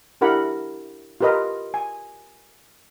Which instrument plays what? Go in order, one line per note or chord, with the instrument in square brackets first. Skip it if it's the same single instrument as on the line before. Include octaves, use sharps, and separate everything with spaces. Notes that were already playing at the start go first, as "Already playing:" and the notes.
[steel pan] D4 E4 G4 A#4 F#5 B5
F4 G4 A#4 B4 D#5 A#5
G#5